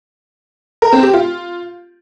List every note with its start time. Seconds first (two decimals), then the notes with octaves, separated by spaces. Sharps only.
0.82 A#4
0.93 C4
1.03 G4
1.13 F4